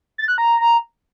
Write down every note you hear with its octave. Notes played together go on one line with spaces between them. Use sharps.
A6
F#6
A#5